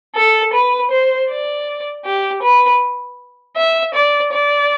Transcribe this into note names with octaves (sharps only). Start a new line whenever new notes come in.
A4
B4
C5
D5
G4
B4
E5
D5
D5